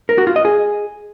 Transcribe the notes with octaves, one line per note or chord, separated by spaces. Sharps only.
A#4
F#4
F4
D#5
G#4